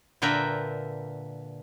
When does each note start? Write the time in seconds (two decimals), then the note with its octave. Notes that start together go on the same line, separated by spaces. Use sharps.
0.22 A#2 D3 A#4 B4 E5 G5